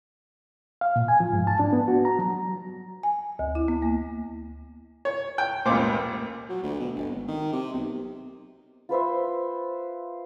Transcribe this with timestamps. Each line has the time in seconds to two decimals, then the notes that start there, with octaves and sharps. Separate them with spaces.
0.81 F5
0.96 A#2
1.08 G#5
1.20 F3
1.33 G#2
1.47 A5
1.60 D4
1.73 B3
1.88 F#4
2.05 A#5
2.19 F#3
3.03 G#5
3.39 D2
3.55 E4
3.68 B3
3.82 A#3
5.05 C#5
5.38 G5
5.66 F1 C#2 A#2 C5 D6
6.49 F#3
6.63 D2
6.79 B2
6.95 G1
7.11 G#1
7.28 D#3
7.53 C3
7.73 B1
8.89 F4 B4 C5 E5